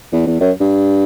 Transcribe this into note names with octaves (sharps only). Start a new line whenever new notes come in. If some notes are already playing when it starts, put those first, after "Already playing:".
E2
E2
F#2
G2